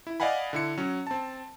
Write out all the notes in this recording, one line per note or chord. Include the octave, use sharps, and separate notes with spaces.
E4
D5 D#5 F5 F#5 G#5 B5
D3 E4 C#7
F#3 C#4
C4 A5